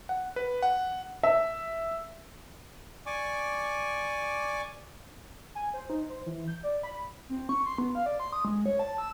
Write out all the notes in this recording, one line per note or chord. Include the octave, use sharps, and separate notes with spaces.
F#5
B4
F#5
E5
D5 G#5 C#6 D6
G#5
C5
D#4
C5
E3
G6
D5
B5
C4
C#6
C6
B3
F5
D5
C6
D#6
G#3
C#5
A5
E6